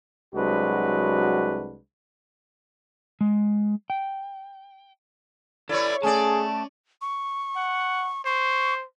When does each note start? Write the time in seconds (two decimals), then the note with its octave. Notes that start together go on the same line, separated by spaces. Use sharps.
0.35 C2 F#3 G#3 D4 F#4 B4
3.21 G#3
3.90 G5
5.69 E4 A4 B4 C#5 D5
6.03 A3 C#4 G#4 D5 A5
7.02 C#6
7.56 F#5
8.25 C5 C#6